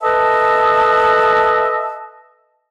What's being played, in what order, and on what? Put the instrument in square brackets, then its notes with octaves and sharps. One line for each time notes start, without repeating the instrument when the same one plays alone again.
[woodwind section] A4 B4 D#5 E5 A5